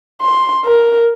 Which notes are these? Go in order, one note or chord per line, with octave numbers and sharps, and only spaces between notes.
C6
A#4